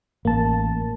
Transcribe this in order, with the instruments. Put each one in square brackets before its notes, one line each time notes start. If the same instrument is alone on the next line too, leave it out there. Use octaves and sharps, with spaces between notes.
[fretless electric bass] A1 [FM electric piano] A#3 A5